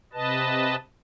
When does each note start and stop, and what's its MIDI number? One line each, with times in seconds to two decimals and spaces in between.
0.13 0.75 48
0.13 0.75 71
0.13 0.75 75
0.13 0.75 81